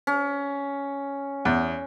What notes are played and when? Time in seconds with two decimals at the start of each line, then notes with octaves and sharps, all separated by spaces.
0.07 C#4
1.45 E2